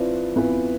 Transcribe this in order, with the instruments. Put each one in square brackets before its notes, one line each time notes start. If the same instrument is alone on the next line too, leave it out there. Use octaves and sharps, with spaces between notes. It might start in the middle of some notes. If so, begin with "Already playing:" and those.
Already playing: [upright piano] F3 C4 E4 B4 D5
F2 E3 B3 F4 B4